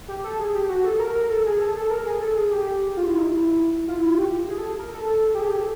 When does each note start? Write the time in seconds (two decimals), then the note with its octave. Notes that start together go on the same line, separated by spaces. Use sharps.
0.08 G4
0.24 A4
0.40 G#4
0.55 G4
0.69 F#4
0.84 A4
0.99 A#4
1.15 A#4
1.30 A4
1.46 G#4
1.61 A4
1.76 A4
1.90 A#4
2.06 G#4
2.21 A4
2.36 G#4
2.51 G4
2.97 F4
3.07 E4
3.18 D#4
3.28 E4
3.88 F4
3.98 E4
4.08 F4
4.17 G4
4.48 G#4
4.58 A4
4.79 A#4
4.94 A4
5.10 A4
5.35 G4
5.40 G#4
5.49 G4
5.60 A4